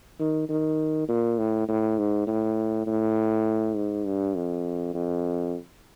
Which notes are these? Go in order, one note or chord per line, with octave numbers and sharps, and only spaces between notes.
D#3
D#3
A#2
A2
A2
G#2
A2
A2
G#2
G2
F2
F2